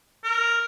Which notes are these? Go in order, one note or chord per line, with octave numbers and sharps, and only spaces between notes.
A#4